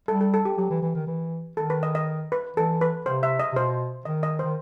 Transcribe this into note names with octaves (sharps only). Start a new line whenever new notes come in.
G3 A4
A4
A4
G4
F#3 G4
E3
E3
D#3
E3
D#3 A4
B4
D#5
D#5
B4
E3 A4
B4
C3 C5
E5
D#5
C3
B2 C5
D#3 D#5
D#5
C5
D#3